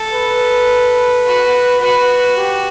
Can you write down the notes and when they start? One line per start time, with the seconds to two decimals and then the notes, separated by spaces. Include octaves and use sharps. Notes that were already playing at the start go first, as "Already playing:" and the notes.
Already playing: A4
0.14 B4
1.25 F#4
1.81 F#4 B4
2.36 G4